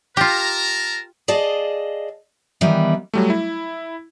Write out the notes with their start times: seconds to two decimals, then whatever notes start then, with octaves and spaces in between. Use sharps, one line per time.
0.17 F4 G4 A#4 A5 A#5
1.28 G#4 D5 D#5 F5 A5
2.61 D#3 E3 G3 B3
3.14 F#3 G3 A3
3.30 E4